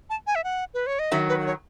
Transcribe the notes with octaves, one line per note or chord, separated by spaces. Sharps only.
A5
G#5
E5
F#5
B4
C#5
D#5
D#3 F#3 E5
B4
C#5